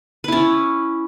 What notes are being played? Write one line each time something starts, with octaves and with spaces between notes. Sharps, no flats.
C#4 E4 B4